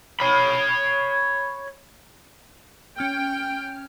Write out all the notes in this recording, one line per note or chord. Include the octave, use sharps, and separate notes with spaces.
C#5 B5
C#4 G5 F6